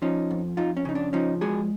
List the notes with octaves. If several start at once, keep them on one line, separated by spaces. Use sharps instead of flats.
F3 C#4 D#4
F2
F2 D#4 F4
C#4
C#3 D#4
D4
F3 C#4 D#4
G#3 F#4 G#4